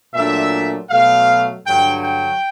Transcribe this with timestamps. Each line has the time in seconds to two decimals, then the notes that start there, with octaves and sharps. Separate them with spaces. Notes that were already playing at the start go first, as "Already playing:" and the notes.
0.14 A#2 F#3 A3 D4 E5
0.91 B2 F#3 A3 F5
1.67 G2 D3 F#3 G5
2.05 G5